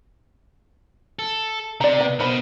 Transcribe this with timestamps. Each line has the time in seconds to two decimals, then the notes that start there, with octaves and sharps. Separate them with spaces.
1.19 A4
1.81 C3 D5 A#5
2.00 B3 G5
2.19 B2 A#4 C5 B5